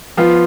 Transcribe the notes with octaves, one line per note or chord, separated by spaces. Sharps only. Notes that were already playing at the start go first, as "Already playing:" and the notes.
F3 B3 F4